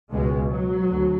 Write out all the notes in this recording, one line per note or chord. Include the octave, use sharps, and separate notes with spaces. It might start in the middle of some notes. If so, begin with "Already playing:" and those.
C#2 B2 G#3
F#3
D2